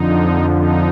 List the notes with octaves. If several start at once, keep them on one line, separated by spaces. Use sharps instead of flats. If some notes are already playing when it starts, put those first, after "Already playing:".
Already playing: F2 D3 F3 D#4
D#4